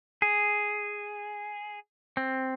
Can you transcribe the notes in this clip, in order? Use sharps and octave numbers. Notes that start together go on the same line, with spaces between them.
G#4
C4